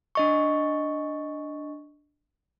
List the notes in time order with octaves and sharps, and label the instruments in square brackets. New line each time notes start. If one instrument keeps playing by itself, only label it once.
[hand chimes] D4 D#5 C#6